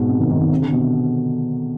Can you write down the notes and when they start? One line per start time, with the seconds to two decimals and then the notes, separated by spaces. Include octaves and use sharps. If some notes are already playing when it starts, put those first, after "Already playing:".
Already playing: G#2 B2
0.09 C3
0.20 D#3
0.31 D#3
0.41 D#3
0.52 C3
0.62 D3
0.72 B2